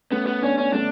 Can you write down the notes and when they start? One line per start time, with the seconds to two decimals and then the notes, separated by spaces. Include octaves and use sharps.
0.11 A3 B3 C#4
0.27 B3
0.42 B3 C#4 D4
0.58 C#4
0.73 A3 C#4 D4